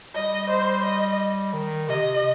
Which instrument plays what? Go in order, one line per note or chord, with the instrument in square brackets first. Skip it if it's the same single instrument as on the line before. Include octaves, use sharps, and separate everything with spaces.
[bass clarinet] G3 [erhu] D#5
[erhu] C5
D#5
[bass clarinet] D#3
[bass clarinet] C3 [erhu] D#5